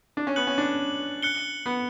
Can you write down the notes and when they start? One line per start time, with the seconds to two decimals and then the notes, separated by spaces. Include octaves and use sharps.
0.17 D4
0.27 C#4
0.36 B3 F#6 C#7 F#7
0.47 C#4
0.58 D4
1.23 F#6 C#7 G7
1.66 B3